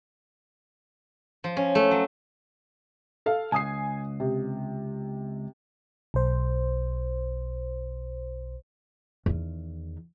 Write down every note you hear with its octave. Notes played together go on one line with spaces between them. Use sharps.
F3
C#4
A3
F#3
A4 F5
C#2 G#5 D#6 C7
C3
B1 C5
E2 D#3